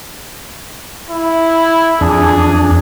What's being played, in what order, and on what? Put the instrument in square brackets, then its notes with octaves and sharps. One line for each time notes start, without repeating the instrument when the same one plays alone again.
[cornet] E4
[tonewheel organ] F2 D4 [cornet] G#4